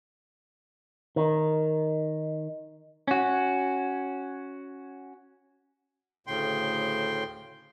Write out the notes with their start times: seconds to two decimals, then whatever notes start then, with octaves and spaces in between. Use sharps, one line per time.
1.16 D#3
3.08 C#4 F#4
6.27 D2 A2 C#3 G5 C6